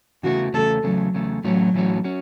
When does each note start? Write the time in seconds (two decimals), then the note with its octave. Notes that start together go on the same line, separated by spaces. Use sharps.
0.23 E2 C#3 E3 A3 F#4
0.54 E2 C#3 A3 A4
0.83 E2 C#3 F#3 A3
1.14 E2 C#3 A3
1.44 A2 E3 F#3 A3 C#4 F#4
1.74 A2 E3 A3 C#4 F#4
2.04 C#4 F#4